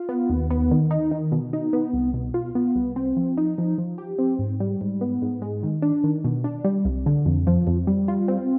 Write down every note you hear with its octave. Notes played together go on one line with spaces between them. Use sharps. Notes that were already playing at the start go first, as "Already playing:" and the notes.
Already playing: F4
B3
D#2
B3
D#3
D#4
D#3
B2
D#4
B3
C2
B2
F4
B3
C2
C4
F3
D#4
F3
F3
G4
C4
G#2
G3
G#2
B3
G#2
G#3
D#3
D4
D#3
B2
D4
G3
C2
D3
F2
F3
F2
G3
F4
C4